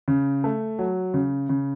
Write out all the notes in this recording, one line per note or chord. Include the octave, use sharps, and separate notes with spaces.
C#3
A3
F#3
C#3
C#3